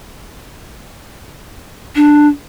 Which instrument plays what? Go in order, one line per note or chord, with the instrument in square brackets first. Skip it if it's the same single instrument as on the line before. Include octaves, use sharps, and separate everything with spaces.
[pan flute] D4